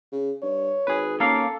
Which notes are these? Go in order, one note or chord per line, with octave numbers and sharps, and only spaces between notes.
C#3
G2 C#5
G#1 G#4 B4
A#3 C#4 A4 A#4 F5